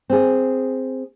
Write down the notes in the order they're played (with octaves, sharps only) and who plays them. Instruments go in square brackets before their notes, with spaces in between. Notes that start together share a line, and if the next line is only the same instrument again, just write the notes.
[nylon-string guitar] C4 G#4